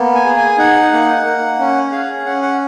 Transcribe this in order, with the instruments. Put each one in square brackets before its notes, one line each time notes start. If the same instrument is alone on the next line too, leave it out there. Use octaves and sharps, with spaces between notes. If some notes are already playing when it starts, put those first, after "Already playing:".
Already playing: [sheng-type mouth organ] A#3 B3
G#5
G#4
G#5
D#4 F#5
A#3
A#3
C#4
G#4 F5
C#4 F#5
F#5